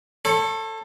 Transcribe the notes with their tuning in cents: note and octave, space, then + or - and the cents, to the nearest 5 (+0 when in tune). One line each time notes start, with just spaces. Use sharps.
A4 +15 C#5 -35